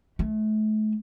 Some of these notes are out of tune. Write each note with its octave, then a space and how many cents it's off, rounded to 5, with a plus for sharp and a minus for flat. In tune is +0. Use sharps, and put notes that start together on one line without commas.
A3 -35